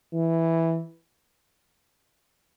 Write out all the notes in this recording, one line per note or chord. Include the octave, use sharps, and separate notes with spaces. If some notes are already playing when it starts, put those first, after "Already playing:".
E3